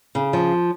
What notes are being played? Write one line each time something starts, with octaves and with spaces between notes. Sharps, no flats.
C#3
F3